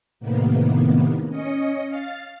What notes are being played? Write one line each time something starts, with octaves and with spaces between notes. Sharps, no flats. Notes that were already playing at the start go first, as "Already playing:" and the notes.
A2 C3 D#3 A#3 B3
C#4 D#5 C#7
F5 A6